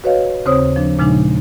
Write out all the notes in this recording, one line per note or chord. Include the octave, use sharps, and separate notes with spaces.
F#4 B4 C#5 D#5 F5
D#2 C#3 C4 C5 C#5 D#6
F3 D4
A#2 C#3 F3 G#3 D4 D#4